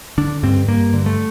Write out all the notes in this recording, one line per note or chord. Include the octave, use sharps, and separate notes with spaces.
D3 D4
G2 C4
G2 A#3
D3
A3